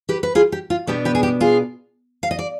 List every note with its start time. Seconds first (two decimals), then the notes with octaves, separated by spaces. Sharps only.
0.09 G4 B4
0.23 B4
0.35 F4 G#4
0.52 G4
0.70 F4
0.87 B2 B3 D4 G4
1.05 G4 B4
1.15 G#4
1.23 G4
1.40 F4 G#4
2.23 F5
2.31 D#5
2.39 D5